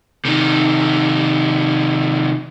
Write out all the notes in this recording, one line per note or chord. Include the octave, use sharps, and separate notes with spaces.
C3 D#3